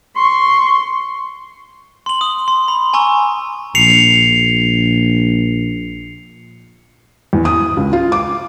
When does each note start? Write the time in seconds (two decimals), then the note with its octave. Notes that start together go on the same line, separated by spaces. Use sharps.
0.16 C6 C#6
2.06 C6 F#7
2.21 D#6
2.48 C6
2.68 B5
2.93 G#5 A#5 C#6 E6
3.75 A#1 C7 C#7 F7
7.33 E2
7.45 D#6
7.77 C#2
7.93 F4
8.12 D6